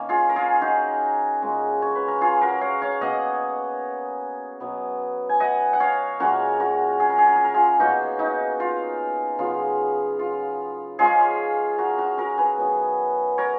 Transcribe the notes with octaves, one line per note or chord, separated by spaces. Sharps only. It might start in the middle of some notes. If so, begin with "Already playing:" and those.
Already playing: D#3 A#3 C#4
F4 G#4
A#4
F4 G#4
D#4 F#4
A#2 G#3 C#4
C#5
B4
A#4
F4 G#4
F#4 A#4
C#5 F5
C#5 F5
B2 A#3 C#4 D#5 F#5
B2 F#3 B3
G#5
D#5 F#5
F#5
C#5 F5
A#2 G#3 C#4 F#4 A#4
F#4 A#4
G#4
A#4
G#4
A#4
G#4
A#4
F4 G#4
B2 A#3 C#4 D#4 F#4
D#4
F4
C#3 F#3 B3 F4
F4
F3 G#3 C#4 F4 G#4
F#4 A#4
F#4 A#4
F#4 A#4
G#4 B4
D#3 F#3 B3
A#4 C#5